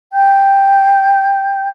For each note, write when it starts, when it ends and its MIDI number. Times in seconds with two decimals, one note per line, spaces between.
0.13 1.67 79
0.13 1.67 91